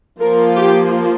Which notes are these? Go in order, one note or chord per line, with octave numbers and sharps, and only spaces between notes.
F3 A#3 F4 A#4
G4